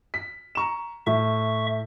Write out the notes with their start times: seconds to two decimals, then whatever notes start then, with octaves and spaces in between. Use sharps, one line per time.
0.14 B6
0.55 A#5 C#6 E7
1.07 A2 E5 C#6